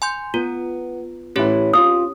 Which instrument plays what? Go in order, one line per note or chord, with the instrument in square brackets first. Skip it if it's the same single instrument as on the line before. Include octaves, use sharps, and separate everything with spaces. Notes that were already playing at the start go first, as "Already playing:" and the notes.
[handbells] G#5 C6 G6
[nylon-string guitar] B3 [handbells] F4
[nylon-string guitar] A2 E3 E4 [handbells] C#4 G4 C#5
[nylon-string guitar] C4 F4 [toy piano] D#6